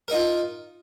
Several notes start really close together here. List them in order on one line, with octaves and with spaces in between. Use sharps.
A#4 D#4 F4